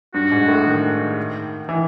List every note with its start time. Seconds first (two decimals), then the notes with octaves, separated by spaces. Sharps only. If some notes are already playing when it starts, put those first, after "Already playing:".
0.14 G2 F#4
0.32 G#2
0.48 A2
0.66 D#3
1.69 E3